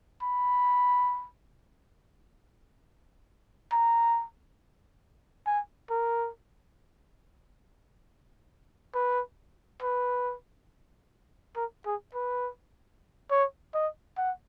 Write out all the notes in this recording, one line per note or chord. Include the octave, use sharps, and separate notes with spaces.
B5
A#5
G#5
A#4
B4
B4
A#4
G#4
B4
C#5
D#5
F#5